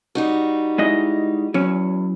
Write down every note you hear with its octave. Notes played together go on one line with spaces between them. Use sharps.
G3 D#4 F#4
G#3 E4 D#5
E2 F#3 C#4